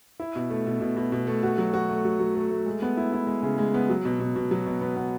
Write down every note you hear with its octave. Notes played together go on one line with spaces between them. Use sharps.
E4
B2
A3
B2
B2
B2
B2
A3
F#4
F#3
F#4
A3
F#3
F#3
A3
A3
G#3
B3
E4
E4
G#3
C#3
G#3
B3
F#3
B2
B2
B2
F#3
B2
B3
B3